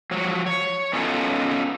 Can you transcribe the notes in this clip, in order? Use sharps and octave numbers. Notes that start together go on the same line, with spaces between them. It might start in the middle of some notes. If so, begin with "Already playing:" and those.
F3 F#3 C#5
C#5
B3 C#4 D#4 F4 A4